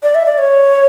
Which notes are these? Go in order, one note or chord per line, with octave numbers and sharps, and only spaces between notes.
D5
E5
D5
C#5